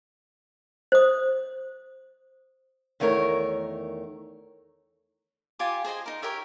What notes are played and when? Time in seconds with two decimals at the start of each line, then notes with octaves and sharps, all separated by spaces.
0.92 C5 D#6
3.00 E2 D#3 A3 A#4 C#5
5.59 F4 G4 G#5 D6
5.84 G#4 C5 D#5 G#5
6.06 D#4 A#4
6.22 G4 A#4 C#5 E5